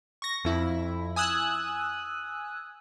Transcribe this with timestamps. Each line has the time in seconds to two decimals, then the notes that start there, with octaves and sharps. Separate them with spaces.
0.22 C#6 A#6
0.44 F2 E4
1.16 G#5 D#6 E6 F#6